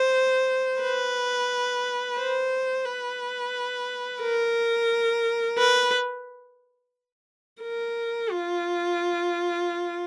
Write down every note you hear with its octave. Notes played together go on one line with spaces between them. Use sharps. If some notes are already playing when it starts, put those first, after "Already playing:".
Already playing: C5
B4
C5
B4
A#4
B4
A#4
F4